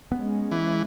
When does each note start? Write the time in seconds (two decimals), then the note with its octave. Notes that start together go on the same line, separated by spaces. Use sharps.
0.12 G#3 B3 C#4
0.51 E3